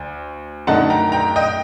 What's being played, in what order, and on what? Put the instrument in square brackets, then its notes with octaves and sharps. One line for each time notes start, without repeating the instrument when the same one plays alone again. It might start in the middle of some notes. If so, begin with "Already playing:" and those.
Already playing: [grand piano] D2
F#2 D3 A3 D#4 F#5 A5
G5 A#5
G5 A#5
D#5 G5